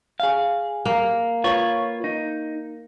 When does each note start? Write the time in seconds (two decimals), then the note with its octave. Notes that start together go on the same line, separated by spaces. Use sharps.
0.20 G#4 F5
0.85 A#3
1.44 F4 B4 C#5
2.04 D#4